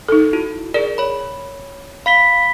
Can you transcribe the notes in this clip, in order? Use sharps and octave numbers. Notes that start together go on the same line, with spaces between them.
D#4 A4
E4 F#4
G#4 A#4 D5
C#5 B5
F5 B5 B6 G7